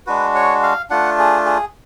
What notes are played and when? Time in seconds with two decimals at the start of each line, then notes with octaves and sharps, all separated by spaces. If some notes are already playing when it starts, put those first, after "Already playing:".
0.07 G#3 D4 F#4 B4
0.35 C#5
0.63 F5
0.90 A3 D4 F4 F#5
1.19 G#4
1.46 G#4